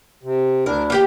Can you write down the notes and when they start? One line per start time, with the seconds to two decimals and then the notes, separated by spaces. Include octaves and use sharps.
0.23 C3
0.66 D2 D4 E4 A#4
0.90 A#3 G4 G5